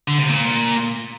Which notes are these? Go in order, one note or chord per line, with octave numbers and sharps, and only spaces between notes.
D3
C3
A#2